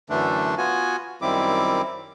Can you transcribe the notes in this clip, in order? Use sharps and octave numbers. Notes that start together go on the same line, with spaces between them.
F#2 D3 E3 A3 D4
B3 F4 F#4 G#5
F#2 D#3 G3 C4 E4 D6